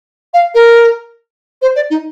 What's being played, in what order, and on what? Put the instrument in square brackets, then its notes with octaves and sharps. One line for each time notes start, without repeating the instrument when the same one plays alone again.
[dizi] F5
A#4
C5
D5
D#4